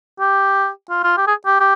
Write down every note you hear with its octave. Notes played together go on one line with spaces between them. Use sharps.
G4
F4
F4
G4
G#4
G4
G4